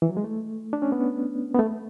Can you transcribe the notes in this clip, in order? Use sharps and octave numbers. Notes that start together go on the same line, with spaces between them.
E3
F#3
G#3
A3
D4
C#4
B3
B3
A3